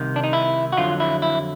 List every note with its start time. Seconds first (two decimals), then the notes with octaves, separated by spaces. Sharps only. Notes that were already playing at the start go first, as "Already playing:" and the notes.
Already playing: C2 C3 D#3
0.16 D4
0.24 D#4
0.33 E4
0.73 F#4
0.77 F2 D3 F#3 F4
1.00 E4
1.22 E4